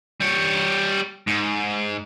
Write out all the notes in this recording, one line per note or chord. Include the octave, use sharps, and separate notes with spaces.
G3 C#5
G#2